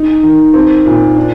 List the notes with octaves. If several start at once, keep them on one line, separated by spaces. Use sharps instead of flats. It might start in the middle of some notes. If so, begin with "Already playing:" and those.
Already playing: D#4
D#3
C4
A#2
D4